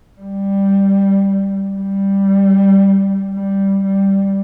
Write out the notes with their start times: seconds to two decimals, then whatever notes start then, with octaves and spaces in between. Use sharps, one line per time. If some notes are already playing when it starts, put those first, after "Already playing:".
0.20 G3
1.77 G3
3.33 G3
3.85 G3